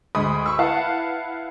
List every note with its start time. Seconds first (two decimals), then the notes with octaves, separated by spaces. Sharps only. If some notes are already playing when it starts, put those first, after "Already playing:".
0.15 D2 G#3 B5 D#6
0.46 B5 C#6 E6
0.59 E4 B4 F5 F#5 A5